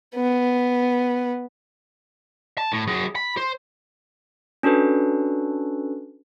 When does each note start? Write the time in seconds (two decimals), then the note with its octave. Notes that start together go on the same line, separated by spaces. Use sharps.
0.15 B3
2.58 A5
2.73 A2
2.87 F#3 G#4
3.16 B5
3.37 C5
4.63 C#4 D4 F#4 A4 B4